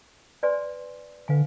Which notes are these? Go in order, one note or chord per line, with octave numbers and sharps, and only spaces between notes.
B4 D5 G#5 C6
D3 B4 F5 G#5